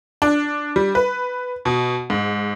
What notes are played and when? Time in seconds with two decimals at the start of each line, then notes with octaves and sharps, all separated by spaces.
0.22 D4
0.76 G3
0.95 B4
1.65 B2
2.10 G#2